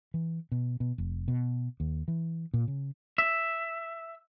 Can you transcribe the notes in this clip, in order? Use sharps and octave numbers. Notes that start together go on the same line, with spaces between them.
E3
B2
B2
F1
B2
D#2
E3
A#2
C#3
E5